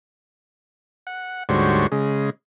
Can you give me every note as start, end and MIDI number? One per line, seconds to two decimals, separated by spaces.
1.07 1.43 78
1.49 1.87 38
1.49 1.87 44
1.49 1.87 55
1.49 1.87 66
1.49 1.87 72
1.49 1.87 73
1.92 2.30 49
1.92 2.30 56